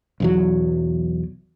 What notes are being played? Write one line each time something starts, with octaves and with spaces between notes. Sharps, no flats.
B1 E2 F#3